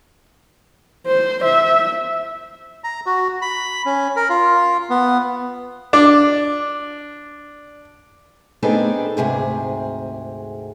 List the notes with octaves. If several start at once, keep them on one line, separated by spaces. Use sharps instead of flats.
C5
E5
A#5
F#4
B5
C#4
A#4
F4
B3
D4 D6
B3 C4 D4 D#4 G#4 A4
D2 G#2 C3 G#4